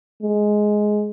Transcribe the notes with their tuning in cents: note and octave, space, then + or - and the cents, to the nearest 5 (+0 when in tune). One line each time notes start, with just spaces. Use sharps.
G#3 +10